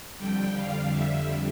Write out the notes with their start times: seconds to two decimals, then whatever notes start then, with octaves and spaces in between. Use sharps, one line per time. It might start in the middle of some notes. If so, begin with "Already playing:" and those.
0.19 F2 D3 G3 G5
0.55 F5
0.92 E5